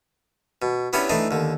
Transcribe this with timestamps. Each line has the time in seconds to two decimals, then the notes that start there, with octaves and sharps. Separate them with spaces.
0.62 B2
0.93 B3 C#4 D4 E4 G4 C#5
1.09 E3 A3 D4 D#4
1.31 D#2 D3